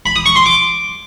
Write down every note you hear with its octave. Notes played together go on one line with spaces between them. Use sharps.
B5
D#6
C#6
C6
D6